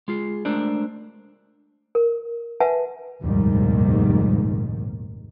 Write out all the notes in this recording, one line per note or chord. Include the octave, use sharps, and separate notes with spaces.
G#3 F4 G#4
G#3 A3 D4 A#4 C5 D5
A#4
B4 E5 F#5 G#5 A5
F1 A#1 D#2 G#2 D#3 G3